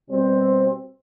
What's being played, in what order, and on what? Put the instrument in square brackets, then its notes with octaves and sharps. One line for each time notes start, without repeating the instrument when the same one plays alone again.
[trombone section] B2 G3 C4